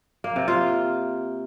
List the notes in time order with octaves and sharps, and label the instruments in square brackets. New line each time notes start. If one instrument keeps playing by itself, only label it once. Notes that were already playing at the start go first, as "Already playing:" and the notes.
[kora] A#3
C3
F4